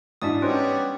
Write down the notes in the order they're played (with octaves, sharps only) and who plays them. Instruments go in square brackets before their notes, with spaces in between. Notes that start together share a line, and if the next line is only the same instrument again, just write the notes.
[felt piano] G#2 E3 F#4 [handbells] D4 D5 D#6
[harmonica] G3 B3 C#5 [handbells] C#4 [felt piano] D#4 C5 C6